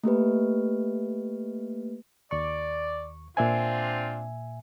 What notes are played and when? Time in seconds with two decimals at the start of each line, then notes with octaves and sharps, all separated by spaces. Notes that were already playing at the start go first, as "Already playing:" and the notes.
0.04 A3 A#3 G4 B4
2.31 D#2 D5 C#6
3.37 A#2 C4 D4 F4 E5 G#5